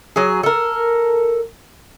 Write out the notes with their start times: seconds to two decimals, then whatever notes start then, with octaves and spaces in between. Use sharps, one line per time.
0.16 F#3 G#4
0.43 A4 A#4